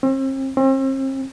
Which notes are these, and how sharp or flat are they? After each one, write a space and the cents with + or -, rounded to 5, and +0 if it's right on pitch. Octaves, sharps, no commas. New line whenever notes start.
C4 +40
C4 +40